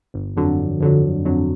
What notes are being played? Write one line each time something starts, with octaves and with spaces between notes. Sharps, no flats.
G1
F2 D3 F#3
G1
F2 D3 F#3
G1
F2 D3 F#3